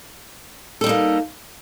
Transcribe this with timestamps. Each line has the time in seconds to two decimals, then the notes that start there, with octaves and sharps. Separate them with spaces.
0.81 A4
0.84 G3
0.86 D#4
0.89 A#3